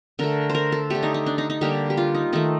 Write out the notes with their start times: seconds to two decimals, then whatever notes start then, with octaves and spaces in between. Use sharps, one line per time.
0.19 D3 A3 A#4
0.50 C5
0.55 A#4
0.72 A4
0.90 D3 A3 G4
1.03 D#4
1.14 D#4
1.26 D4
1.38 D#4
1.50 D#4
1.61 D3 G3 A#3 G4
1.90 G4
1.97 F4
2.15 D#4
2.33 D#3 A3 D#4